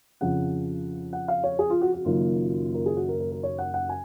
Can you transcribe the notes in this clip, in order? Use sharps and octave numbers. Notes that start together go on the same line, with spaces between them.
F2 C#3 F3 F#5
F#5
F5
C#5
G#4
F4
F#4
F#4
F#1 F#2 D#3 A#3 F4
A#4
G#4
F#4
A#4
A#4
A#4
C#5
F#5
F#5
G#5